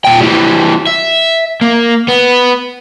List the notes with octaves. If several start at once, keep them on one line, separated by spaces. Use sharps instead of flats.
A#2 G5
E3 G3
E5
A#3
B3